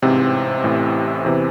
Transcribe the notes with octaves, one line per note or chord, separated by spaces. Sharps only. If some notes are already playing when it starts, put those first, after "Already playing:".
A1 G#2 C3 E3 C4
A1 A2 E3
E2 C3 E3